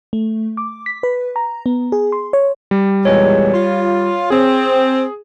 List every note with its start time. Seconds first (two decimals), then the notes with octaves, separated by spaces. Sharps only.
0.13 A3
0.57 D6
0.86 B6
1.03 B4
1.36 A#5
1.66 B3
1.92 G#4
2.12 C6
2.33 C#5
2.71 G3
3.05 E2 A#2 G#3 C#5
3.54 F4
4.30 C4 G#4